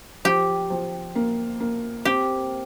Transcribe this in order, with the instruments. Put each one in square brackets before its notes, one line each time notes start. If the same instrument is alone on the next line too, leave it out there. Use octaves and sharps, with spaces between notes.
[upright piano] F3 [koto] G4
[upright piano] F3
A#3
A#3
[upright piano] C4 [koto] G4